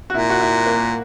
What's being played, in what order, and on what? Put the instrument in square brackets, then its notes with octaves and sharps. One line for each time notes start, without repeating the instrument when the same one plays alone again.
[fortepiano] F#4
[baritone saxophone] A#2 [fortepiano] E4
[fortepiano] F#4
E4
A#3